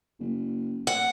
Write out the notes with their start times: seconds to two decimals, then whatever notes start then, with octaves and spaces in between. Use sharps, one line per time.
0.20 F#1
0.87 F#5